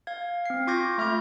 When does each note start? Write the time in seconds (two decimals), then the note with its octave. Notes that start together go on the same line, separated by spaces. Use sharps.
0.07 F5 G#6
0.46 C4 C7
0.67 F4 C#6 D6 G6 G#6 A#6
0.98 A3 E5 F6 G6